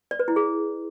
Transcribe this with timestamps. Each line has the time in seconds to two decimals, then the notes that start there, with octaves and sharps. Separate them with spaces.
0.11 D5
0.19 B4
0.28 E4
0.36 G#4